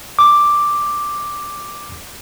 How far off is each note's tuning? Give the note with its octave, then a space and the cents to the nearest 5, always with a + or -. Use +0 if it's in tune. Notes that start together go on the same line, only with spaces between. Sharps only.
D6 +5